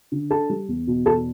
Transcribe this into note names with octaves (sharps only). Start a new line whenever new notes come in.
D3
D4 A4 A5
G3
E2
B2
E2 A4 A5